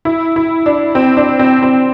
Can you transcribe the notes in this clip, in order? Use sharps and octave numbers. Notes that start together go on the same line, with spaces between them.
E4
E4
D4
C4
D4
C4
C4